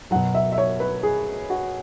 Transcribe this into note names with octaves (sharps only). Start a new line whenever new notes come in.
B2 F#3 F#5
E5
E5
C#5
B4
G#4
F#4